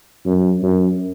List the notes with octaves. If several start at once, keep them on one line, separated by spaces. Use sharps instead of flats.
F#2
F#2